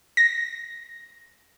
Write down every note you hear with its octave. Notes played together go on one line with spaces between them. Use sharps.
A#6